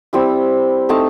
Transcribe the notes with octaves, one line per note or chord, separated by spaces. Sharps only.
G3 C4 E4
A3 C4 D#4 A5